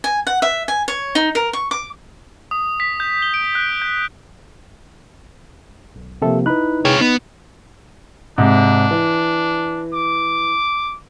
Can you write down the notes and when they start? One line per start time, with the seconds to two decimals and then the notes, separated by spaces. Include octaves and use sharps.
0.04 G#5
0.27 F#5
0.42 E5
0.68 G#5
0.88 C#5
1.15 D#4
1.35 A#4
1.53 C#6
1.71 D6
2.51 D#6
2.80 B6
3.00 G6
3.22 G7
3.34 D7
3.55 F#6
3.82 G6
5.96 B1
6.22 C3 F3 A#3 G4 A4 E5
6.46 D#4 E4 B4 B5 F#6
6.85 C3 F4 G#4 C#5 G5
7.01 B3 D#4
8.38 G#2 C3 D4
8.91 E3
9.93 D6